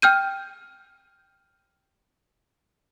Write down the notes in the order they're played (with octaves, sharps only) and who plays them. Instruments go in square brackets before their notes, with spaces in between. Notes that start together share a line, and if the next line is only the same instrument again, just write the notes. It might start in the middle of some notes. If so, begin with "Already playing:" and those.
[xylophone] G5 F6 G6 D#7